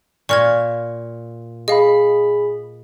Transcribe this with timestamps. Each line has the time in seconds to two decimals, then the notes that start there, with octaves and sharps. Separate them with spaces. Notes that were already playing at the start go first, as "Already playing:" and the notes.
0.29 A#2 C#6 F6 G#6
1.68 G#4 D#5 F5 B5